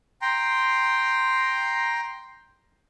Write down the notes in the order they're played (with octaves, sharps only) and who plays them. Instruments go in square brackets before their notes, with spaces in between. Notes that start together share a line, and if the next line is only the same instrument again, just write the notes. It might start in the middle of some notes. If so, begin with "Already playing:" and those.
[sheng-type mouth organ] G5 A#5 C6